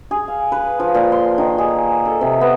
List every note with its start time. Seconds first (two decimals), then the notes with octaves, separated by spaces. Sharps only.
0.11 G#4
0.28 F5
0.52 B4
0.80 F3
0.94 A#2
1.12 C6
1.38 D#3
1.58 G#4
2.05 A4
2.21 C3
2.41 B3